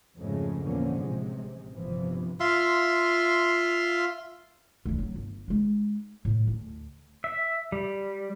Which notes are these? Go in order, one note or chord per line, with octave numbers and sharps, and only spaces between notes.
F2 G#2 C#3 G#3 A3
E2 A#2 D3 F3 A#3 C#4
A1 C3 G#3
G1 C3 E3 F3
F4 E5 F5 C6
D2 E3
F#3 C4
G1
G#3 D#4
A2
D2
E5
G3